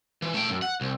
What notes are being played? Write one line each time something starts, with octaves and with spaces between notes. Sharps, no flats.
E3
A3 G5
F#2
F#5
C2